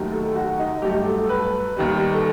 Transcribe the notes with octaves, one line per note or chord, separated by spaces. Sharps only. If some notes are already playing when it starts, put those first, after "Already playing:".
Already playing: D#2 D#3 F#3 A3
A4
F#4
D#4
G2 F#3 A3 G4
A4
B4
D#2 D#3 G3
A4